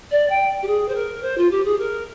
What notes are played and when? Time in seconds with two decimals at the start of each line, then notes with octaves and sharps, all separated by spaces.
0.11 D5
0.29 G5
0.62 G4
0.67 G#4
0.88 C5
0.95 A#4
1.22 C5
1.37 F4
1.51 G4
1.65 G#4
1.79 A#4